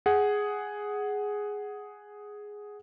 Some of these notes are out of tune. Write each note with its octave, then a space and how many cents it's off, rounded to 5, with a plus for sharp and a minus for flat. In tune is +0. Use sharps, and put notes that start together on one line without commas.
G#4 +0 F#5 +5